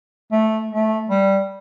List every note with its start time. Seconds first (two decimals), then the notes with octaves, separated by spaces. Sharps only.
0.32 A3
0.71 A3
1.10 G3